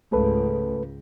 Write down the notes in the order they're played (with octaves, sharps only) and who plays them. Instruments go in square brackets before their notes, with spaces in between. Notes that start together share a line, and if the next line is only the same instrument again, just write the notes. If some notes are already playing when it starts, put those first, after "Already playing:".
[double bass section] C#2 G#2 [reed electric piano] A3 A4 B4